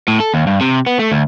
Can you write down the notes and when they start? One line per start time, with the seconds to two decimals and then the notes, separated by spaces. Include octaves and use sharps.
0.08 A2
0.20 A4
0.34 D#2
0.47 G2
0.61 C3
0.86 B3
0.99 A3
1.12 D2